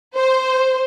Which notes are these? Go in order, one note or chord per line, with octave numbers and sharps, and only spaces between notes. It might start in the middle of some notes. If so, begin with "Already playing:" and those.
C5